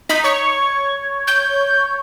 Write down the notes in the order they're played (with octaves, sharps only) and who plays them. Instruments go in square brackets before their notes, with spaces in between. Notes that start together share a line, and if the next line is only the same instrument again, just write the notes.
[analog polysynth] D#4 [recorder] B6
[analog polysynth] C#5 [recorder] C#6
[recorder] G6